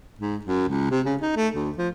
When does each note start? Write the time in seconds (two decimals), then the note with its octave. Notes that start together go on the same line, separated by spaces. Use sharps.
0.19 G#2
0.45 F#2
0.68 C#2
0.90 C3
1.05 C#3
1.21 D#4
1.36 A3
1.54 D2
1.78 F3